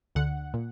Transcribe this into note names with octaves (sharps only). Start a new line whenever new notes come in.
D2 D3 F#5
A#2